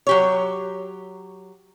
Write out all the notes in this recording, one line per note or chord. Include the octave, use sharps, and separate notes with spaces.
F#3 G4 C#5